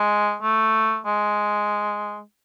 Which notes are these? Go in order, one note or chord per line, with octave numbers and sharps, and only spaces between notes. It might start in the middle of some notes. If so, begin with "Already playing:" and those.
Already playing: G#3
A3
G#3